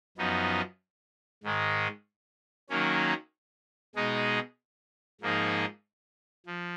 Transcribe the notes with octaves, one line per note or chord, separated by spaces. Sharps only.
F#2 F3 B3 D#4
G#2 D#3 G#3
D#3 F#3 A#3 C#4
B2 G#3 D#4 G#4
G#2 F3 A#3 D#4 G#4
F3